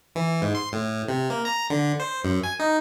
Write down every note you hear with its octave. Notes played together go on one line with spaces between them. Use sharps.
E3
G#2
C6
A2
C3
A#3
A#5
D3
C5
F#2
G#5
D#4